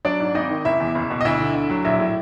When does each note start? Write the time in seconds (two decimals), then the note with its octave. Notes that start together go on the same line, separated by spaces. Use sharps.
0.05 F#3 D4 D5
0.20 G#2
0.35 G#1 D#4 D#5
0.50 D#3
0.65 F#1 E4 E5
0.80 E2
0.95 F#1
1.10 B2
1.21 D#5
1.25 D2 E4 E5
1.40 D3
1.55 D2
1.70 F#3
1.85 A#1 E4 E5
2.00 A2